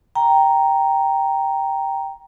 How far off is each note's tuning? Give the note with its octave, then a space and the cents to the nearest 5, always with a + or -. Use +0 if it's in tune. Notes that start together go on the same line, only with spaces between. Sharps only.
G5 +0 A#5 +0